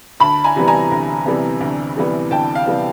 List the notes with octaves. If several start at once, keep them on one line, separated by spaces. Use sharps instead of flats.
D2 A5 B5
G#5 A#5
C3 E3 G3 B3
G#5 A#5
D2
C3 E3 G3 B3
D2
C3 E3 G3 B3
D2 G5 A5
F5
C3 E3 G3 B3